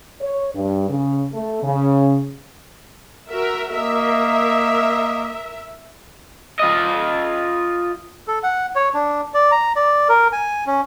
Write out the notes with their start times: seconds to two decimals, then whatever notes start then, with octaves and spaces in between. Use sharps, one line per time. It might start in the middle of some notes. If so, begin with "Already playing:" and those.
0.21 C#5
0.55 G2
0.89 C#3
1.33 A3
1.63 C#3
3.29 F#4 A#4 E5
3.73 A#3 A#4 D#5 E5
6.59 F4 D#5
8.28 A4
8.43 F#5
8.75 C#5
8.94 D4
9.34 D5
9.51 A#5
9.76 D5
10.09 A#4
10.32 G#5
10.66 C#4